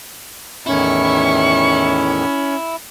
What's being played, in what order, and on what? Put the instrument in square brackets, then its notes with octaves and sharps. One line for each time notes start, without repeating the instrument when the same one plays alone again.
[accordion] E2 A2 D#3 [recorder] C#4 [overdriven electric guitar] E4 [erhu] C#6